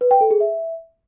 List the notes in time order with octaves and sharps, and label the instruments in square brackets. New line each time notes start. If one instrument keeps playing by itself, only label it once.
[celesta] B4
G5
A4
G#4
E5